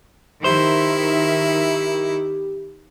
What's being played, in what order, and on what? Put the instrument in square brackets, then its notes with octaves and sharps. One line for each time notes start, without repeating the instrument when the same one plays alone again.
[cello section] D#3 E5 [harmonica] E4 [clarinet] G4 [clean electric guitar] C5